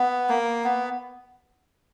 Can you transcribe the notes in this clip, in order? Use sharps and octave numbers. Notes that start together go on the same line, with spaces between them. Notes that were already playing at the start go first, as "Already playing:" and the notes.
Already playing: B3
A#3
B3